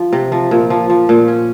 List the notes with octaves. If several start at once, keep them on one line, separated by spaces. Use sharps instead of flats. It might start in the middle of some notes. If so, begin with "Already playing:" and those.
Already playing: F3
C3
F3
A#2
F3
F3
A#2
C#4